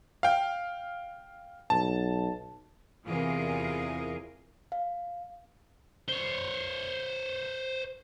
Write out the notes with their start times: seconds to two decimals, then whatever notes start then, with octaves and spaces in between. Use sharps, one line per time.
0.23 F5 G5
1.70 B1 A5
3.04 E2 C3 E3 F4 G#4 A#4
4.72 F5
6.09 C5 C#5